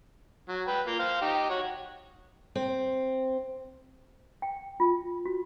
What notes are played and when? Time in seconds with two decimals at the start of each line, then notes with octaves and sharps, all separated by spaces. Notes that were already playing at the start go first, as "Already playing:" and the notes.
0.48 F#3
0.67 B4 G5
0.87 A#3 F4
0.99 C5 F5
1.21 D#4 G4
1.50 F#4 C#5
2.55 C4
4.42 G5
4.80 F4
5.26 F#4